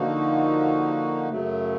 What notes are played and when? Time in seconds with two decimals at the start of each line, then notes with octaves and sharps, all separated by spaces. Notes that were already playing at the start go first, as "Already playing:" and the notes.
Already playing: D3 F3 A#3 D#4 F#4
1.28 F#2 C#3 F#3 A3